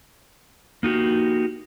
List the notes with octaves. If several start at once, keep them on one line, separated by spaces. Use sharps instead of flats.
A#3 D#4 F#4 G4